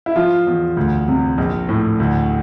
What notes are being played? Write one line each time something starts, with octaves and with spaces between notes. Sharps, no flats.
E4
F3 F4
E2
D2
C3
A#1
A2
D2